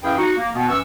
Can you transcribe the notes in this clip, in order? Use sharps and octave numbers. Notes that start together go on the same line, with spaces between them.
F#2 E3 E4 G#4 F5 G5
D#4 F#4
A#3
B2 D#3 B3
F#2 E3 C#6 E6